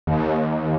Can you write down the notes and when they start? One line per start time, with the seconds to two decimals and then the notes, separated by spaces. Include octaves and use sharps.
0.07 D#2